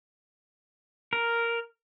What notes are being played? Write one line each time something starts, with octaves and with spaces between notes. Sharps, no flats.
A#4